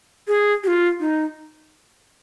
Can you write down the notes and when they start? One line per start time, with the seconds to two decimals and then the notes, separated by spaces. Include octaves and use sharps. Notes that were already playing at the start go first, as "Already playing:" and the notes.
0.28 G#4
0.64 G4
0.67 F4
1.00 D#4